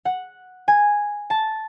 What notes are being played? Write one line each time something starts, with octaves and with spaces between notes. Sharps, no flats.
F#5
G#5
A5